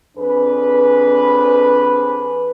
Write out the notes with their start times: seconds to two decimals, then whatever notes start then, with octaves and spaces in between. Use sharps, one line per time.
0.17 F2 D4 G#4 B4